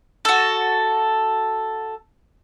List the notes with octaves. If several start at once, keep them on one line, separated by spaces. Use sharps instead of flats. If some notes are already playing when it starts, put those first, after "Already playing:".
F#4 A4